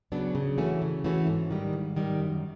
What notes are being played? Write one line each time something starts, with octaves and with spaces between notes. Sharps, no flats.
C#3 F#3 B3 D4
C#3
E3 A3 C#4 F#4
C#3
E3 A3 C#4 F#4
G#2
D#3 G3
G#2
D#3 G3
F#2